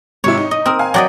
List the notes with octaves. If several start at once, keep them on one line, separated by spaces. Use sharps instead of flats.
G#2 C3 E4 C#5
D#4
D#5
C4 A#4 D#6
F5 G#5
F#3 F#4 D5 D#5 F#5 G5